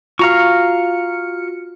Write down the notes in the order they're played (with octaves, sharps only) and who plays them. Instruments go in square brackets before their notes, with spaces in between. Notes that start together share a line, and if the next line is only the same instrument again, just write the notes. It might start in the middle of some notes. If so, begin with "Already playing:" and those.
[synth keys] F4 F#4 C#7 [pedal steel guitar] F5 A#5 C#6